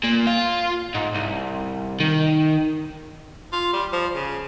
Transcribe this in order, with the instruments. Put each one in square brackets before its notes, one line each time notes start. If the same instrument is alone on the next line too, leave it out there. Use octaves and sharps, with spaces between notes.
[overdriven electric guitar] A#2
F4
G#2
C2
D#3
[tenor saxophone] F4
G3
F3
C#3